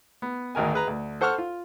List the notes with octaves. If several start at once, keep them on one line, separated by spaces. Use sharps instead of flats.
B3
G#1 D2 D#3 A#4 G#5
G#4 B4 A#5
D2
A4 C5 F#5 C#6 E6 F6
F4